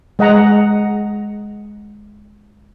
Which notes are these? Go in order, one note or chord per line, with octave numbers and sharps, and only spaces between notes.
G#3 D#5 F#5 A#5